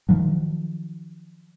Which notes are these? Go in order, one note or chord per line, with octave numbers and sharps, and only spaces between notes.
D#3 F3 F#3